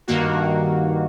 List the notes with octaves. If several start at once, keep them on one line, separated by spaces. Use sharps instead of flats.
G2 D#3 A#3 F#4